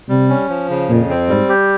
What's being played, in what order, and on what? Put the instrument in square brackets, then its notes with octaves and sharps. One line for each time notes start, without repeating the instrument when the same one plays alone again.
[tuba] C3 [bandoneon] G3
[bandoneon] C#4
F3
C#3
[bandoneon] F2 [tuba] A#2
[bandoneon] C4
[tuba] G#2 [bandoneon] G3
[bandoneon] G4